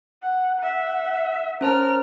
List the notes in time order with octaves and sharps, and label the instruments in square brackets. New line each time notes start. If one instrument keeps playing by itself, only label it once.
[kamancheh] F#5
E5 F#5
[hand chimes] C#4 C5 A5 [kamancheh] A#4 F6